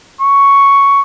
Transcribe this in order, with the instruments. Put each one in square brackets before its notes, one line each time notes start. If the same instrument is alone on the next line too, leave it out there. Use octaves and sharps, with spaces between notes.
[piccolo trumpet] C#6